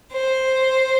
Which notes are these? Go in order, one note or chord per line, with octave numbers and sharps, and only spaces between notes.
C5